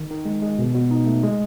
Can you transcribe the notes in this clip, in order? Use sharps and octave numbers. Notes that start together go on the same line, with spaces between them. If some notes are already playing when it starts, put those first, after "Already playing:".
Already playing: D#3
D#3
G#3
G#3
B2
B2
D#4
A3
G#3